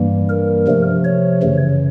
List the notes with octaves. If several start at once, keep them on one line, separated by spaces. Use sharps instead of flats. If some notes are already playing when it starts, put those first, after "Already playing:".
Already playing: G2 E3 G3 A#3
A#4
C3 F3 A3
C#5
F#2 C#3 E3